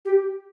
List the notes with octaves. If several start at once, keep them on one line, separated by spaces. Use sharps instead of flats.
G4